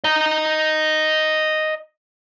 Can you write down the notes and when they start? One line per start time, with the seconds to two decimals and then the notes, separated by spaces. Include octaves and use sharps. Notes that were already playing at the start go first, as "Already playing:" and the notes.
0.04 D#5 A#5